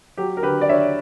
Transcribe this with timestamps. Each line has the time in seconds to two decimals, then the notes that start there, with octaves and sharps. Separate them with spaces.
0.17 F#3 G4
0.37 A#4
0.43 D3 G4 B4
0.61 D5
0.69 D4 C#5 E5